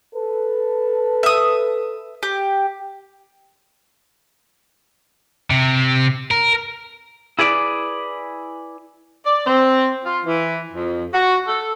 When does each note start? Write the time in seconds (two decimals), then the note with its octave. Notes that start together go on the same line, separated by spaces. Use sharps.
0.14 A4 B4
1.23 E5 D#6
2.23 G4
5.50 C3
6.31 A#4
7.39 E4 G#4 B4 D5
9.25 D5
9.46 C4
10.04 F4
10.24 E3
10.72 F2
11.13 F#4
11.47 A4